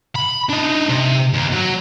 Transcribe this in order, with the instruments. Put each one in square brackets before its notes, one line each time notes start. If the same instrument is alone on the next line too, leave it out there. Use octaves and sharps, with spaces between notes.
[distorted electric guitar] B5
D4 D#4
C3
D#2
F#3